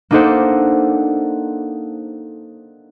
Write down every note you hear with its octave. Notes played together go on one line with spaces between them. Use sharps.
A#3 D4 D#4 A4 C5 F#5